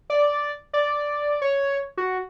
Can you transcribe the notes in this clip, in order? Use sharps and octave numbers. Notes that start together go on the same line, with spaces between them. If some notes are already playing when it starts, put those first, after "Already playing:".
D5
D5
C#5
F#4